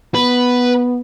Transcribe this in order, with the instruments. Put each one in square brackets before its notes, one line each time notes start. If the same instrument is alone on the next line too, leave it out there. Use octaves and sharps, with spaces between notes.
[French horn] B3 [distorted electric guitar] B4